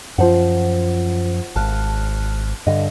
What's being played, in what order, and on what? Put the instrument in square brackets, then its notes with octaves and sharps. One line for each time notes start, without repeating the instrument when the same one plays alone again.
[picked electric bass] F#2 F3 [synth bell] F4 C5 F#5
[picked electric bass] G#1 [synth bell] A5 F6 F#6
[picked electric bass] G2 D3 [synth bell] D#5